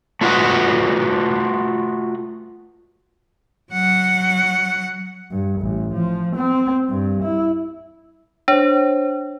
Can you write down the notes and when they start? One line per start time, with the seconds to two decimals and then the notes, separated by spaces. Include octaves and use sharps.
0.21 A3 F4 F#4 A#4 B4 D#5
3.72 F#3 F#5
5.31 G2
5.61 A1
5.94 F3
6.36 C4
6.90 G2
7.23 E4
8.48 D4 C5 C#5